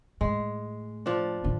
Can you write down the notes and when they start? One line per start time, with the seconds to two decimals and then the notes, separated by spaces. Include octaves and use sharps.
0.21 A2 G#3
1.06 F3 D4
1.44 A2 D3